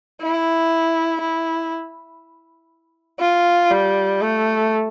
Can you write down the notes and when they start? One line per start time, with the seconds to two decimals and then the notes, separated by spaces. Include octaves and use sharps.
0.22 E4
1.21 E4
3.20 F4
3.70 G3
4.21 A3